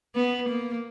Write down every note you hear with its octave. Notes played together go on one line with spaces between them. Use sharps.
B3
A#3